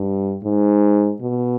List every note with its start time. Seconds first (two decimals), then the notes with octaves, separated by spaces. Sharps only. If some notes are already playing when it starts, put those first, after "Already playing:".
Already playing: G2
0.43 G#2
1.21 B2